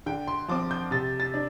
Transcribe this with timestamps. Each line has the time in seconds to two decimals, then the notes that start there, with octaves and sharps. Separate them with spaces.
0.06 D3 G5
0.27 C6
0.48 F3 C4 D6
0.71 G6
0.91 C3 A6
1.20 A6
1.34 D4